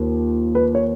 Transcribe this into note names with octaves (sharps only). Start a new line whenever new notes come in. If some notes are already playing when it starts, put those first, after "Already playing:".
Already playing: D#2 F3
B4
C#5